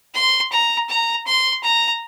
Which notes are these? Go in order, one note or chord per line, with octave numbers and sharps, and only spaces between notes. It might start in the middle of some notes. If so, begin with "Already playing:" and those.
C6
A#5
A#5
C6
A#5